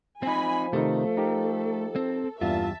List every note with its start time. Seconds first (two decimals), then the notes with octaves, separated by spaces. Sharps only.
0.23 F3 C4 D#4 G#5 B5
0.73 C3 D#3 A3 D#4 A4
1.17 D#4 G4 A#4
1.96 C4
2.41 E2 G2 A#2 F4 E5 A5